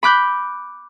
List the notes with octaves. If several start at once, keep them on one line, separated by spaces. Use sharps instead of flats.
B5 D6 F#6 G6